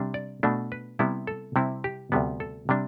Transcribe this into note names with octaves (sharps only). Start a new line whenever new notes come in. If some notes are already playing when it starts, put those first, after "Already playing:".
Already playing: C3 G3 D4
D5
B2 A3 D4
B4
C3 G3 B3 E4
A4
C3 G3 C4 E4
G4
D2 C3 G3 B3
A4
C3 G3 D4